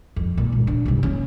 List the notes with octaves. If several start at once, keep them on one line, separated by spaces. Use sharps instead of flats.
F2
A#2
G#1
D4
G2 C3
A#3 C#4